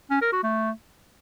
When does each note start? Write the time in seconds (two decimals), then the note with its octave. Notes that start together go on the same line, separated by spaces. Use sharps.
0.10 C#4
0.21 A#4
0.32 F#4
0.43 A3